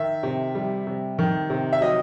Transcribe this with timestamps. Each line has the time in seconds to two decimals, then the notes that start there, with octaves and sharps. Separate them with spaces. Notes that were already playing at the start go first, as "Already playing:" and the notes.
Already playing: D#3 E5
0.23 C3
0.55 G3
0.87 C3
1.19 D#3
1.50 C3
1.73 E5
1.81 F#3 D#5